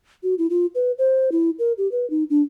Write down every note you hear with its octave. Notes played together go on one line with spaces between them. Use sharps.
F#4
E4
F4
B4
C5
E4
A#4
G4
B4
D#4
D4